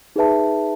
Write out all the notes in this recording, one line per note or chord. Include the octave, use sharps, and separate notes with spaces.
D#4 G#4 B4 E5 A5